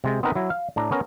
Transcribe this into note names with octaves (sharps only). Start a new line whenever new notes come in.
C3 G#3
B3 C4 D#4 A#4 B4
F#3 E4
F5
A2 D4 A#5
B3 C#4 A#4